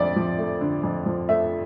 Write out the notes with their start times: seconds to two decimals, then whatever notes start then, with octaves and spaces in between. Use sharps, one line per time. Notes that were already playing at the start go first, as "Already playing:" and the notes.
Already playing: F2 D3 D5 E5
0.16 F3
0.38 A3
0.61 D3
0.84 F2
1.06 F3
1.29 A3 E5